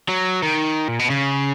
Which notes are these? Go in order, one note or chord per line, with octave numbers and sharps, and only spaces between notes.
F#3
D#3
A#2
B2
C#3